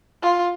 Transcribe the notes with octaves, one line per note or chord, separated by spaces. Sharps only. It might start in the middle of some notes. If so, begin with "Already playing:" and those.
F4